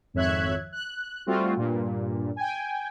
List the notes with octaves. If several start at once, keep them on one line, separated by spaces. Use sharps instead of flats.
G#1 F2 C#5 E5 F#6 G#6
F#6
G3 A3 C4 F4 F#4
G2 A#2
G5 G#5